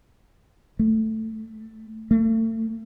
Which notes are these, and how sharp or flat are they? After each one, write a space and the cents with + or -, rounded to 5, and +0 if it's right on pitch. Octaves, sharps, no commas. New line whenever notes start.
A3 +5
A3 +35